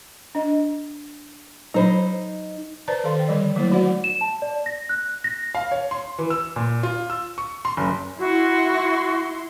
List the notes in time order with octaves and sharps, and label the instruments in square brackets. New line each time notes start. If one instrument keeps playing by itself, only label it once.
[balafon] D4 D#5
[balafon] F#3 C#5 B5 [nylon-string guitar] D#4 C5
[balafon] B4 C5 D5 A5 A#5
D#3 A4 C5 F5 C6
C5 G5
D3 F3 G3 D5
F3 F#3 A3 A#3 E4 C5
D#4 F#4 C5 D5 F#5
[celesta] E7
A5
D5
A#6
F#6
A#6
[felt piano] F5
C#5
C6
E3
E6
A#2
F4
E6
C#6
C6
F#1
[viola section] E4 C6 [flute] F#4